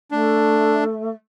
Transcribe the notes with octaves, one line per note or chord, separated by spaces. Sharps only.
A3 D4